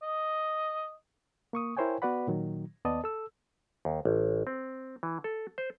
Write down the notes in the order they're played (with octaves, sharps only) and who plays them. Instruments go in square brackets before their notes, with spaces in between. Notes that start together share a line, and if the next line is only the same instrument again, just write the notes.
[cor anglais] D#5
[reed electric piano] A#3 C#6 D#6
E4 A#4 C5 C#5 G5 G#5
B3 F#4 B4 D5 F#5 B5
A#2 D#3 F#3
D#2 B3 D5 D#5 A5 D#6
A4 E6
[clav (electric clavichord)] D#2
A1
C4
E3
A4
C5